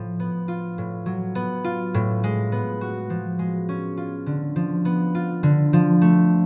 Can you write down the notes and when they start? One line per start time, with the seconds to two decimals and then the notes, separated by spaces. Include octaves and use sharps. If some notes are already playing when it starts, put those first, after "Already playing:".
Already playing: A2 F3
0.20 B3
0.48 F4
0.78 A2
1.06 F#3
1.35 B3
1.64 F4
1.94 A2
2.24 G#3
2.52 B3
2.81 F#4
3.10 F3
3.39 G#3
3.69 C#4
3.97 F4
4.26 D3
4.56 F3
4.85 B3
5.15 F4
5.43 D3
5.73 F3
6.02 A3